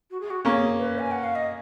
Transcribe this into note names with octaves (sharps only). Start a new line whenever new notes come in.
F#4
G#4
F#4
A#3 C#4 G#4
B4
G#5
F#5
F5
D#5